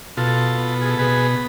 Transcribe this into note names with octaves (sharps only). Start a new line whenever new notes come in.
B2 F4 A4
B3
G#4
A4
B2 G#4 B4